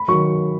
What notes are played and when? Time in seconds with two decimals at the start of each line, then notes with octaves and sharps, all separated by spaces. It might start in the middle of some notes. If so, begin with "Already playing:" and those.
Already playing: B5
0.08 D#3 F#3 C#6